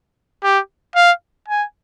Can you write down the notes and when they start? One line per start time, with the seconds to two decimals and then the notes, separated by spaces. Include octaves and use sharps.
0.43 G4
0.96 F5
1.48 G#5